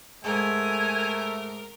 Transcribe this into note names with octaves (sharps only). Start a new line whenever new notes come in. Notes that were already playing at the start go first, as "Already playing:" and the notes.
G#2 A3 A#4 G#5